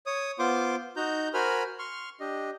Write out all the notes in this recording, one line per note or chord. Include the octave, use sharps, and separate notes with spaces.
C#5 D#6
B3 F4 C5 C6 D6
D#4 F#4 A#5 G6
F#4 A#4 C5 G#5 B5 F6
C6 C#6 F6
D4 G4 D#5